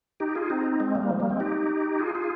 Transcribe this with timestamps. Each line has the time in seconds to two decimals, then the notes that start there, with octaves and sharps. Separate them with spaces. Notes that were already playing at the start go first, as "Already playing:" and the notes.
0.20 D#4 G4
0.35 F4 G#4
0.50 C4 D#4
0.80 G#3 C4
0.95 G3 A#3
1.10 F3 G#3
1.20 G3 A#3
1.30 G#3 C4
1.40 D#4 G4
1.99 F4 G#4
2.15 F4 G#4